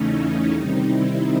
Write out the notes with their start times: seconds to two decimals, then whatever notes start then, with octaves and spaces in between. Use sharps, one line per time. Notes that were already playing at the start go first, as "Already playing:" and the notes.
Already playing: E2 C#3 E3 A3 C#4 D#4
0.53 C3 D#3 G3 C4 D#4
0.86 E4